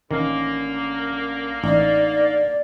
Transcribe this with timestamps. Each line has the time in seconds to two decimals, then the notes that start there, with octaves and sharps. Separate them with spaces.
0.11 A1 D3 D#3 A#3 C#4
1.64 A1 D#4 D5